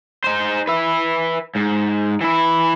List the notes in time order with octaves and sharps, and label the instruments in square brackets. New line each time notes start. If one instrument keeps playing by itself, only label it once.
[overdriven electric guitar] D#4 C5
B4 E5
G#2
E3 E4